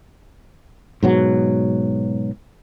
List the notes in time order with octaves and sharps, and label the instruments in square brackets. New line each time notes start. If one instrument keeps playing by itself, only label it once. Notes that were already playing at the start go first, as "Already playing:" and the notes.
[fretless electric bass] G#2 B2 F#3